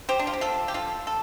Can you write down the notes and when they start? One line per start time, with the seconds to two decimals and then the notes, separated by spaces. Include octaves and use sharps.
0.09 G4 C5
0.19 D4
0.27 F4
0.33 G4
0.41 F4 A4
0.68 G4
0.74 F4 A4
1.07 A4